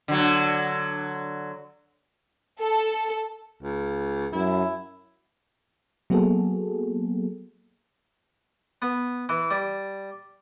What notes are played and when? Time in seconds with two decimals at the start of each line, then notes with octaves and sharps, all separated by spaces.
0.08 D3 F#3
2.60 A4
3.63 C#2
4.33 F#2 E4
6.10 F#3 A#3 B3 F#4 G#4 A4
8.82 B3
9.29 E3
9.51 G3